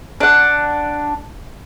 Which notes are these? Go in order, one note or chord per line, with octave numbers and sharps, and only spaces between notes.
D4 F#5